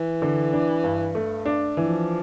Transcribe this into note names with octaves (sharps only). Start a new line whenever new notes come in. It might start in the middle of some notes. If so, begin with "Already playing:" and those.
Already playing: E3
D3
D4
G2
A3
D4
E3 F3